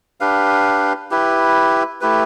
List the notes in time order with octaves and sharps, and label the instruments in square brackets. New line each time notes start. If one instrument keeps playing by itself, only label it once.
[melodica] D4 G4 B4 F5
E4 G4 B4
A3 E4 G4 B4